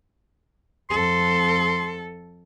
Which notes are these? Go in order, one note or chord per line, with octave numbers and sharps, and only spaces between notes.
F2 A4 C6